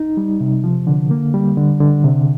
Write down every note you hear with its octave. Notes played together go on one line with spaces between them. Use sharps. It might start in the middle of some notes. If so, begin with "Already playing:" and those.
Already playing: D#4
G3
C3
F3
D3
A#3
G3
D3
D3
C3